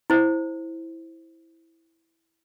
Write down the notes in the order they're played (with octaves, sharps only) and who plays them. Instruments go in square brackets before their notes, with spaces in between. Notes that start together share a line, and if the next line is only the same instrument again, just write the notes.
[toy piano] E4 C5